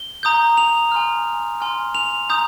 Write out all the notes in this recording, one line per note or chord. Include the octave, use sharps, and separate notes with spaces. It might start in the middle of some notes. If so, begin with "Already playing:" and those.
Already playing: G7
A#5 D#6 G6
F7
G#5 C6 F6
G#5 C6 F6
F7
A#5 D#6 G6